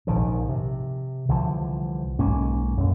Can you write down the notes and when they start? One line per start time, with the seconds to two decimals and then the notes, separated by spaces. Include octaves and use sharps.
0.07 A#1 G#2 D#3 F3
0.49 C3
1.29 C2 D3 E3 F3
2.19 B1 G#2 A#3 C#4
2.77 D#1 F#2